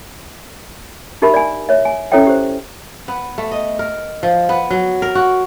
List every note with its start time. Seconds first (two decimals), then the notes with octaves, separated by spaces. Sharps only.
1.22 D4 D#4 G4 A#4 E5 B5
1.34 D5 G#5
1.69 C#5 E5
1.85 G#5
2.12 C#4 E4 A4 C#5 E5 G5
2.27 G4 C5
3.08 B3
3.38 A3
3.52 D#5
3.79 A#4
4.23 F3
4.49 B3
4.70 F#3
5.02 A#4
5.15 F#4